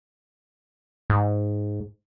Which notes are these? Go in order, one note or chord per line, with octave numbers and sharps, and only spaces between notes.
G#2